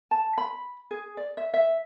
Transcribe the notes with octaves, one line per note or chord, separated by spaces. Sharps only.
A5
B5
G#4
D5
E5
E5